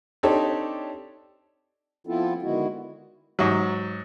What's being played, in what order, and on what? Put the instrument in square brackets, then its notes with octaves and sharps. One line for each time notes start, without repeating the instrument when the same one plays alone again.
[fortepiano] C4 D4 D#4 G4 A4 C#5
[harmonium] F3 B3 C4 E4 F4 A4
D3 D#3 G#3 B3 E4 F#4
[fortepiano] G#2 F#3